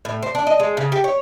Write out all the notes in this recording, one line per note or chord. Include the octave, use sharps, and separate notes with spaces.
A2
C5
D4
D#5
G#3
C#3
G4
C#5